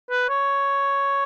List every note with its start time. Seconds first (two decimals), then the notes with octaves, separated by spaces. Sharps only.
0.11 B4
0.29 C#5